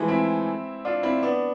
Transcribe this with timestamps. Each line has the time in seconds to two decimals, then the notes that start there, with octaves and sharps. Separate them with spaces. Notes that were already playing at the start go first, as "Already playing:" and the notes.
Already playing: E3 F3 G#3 A3
0.08 C4 E4
0.85 D4 F4
1.03 C4 E4
1.22 B3 D4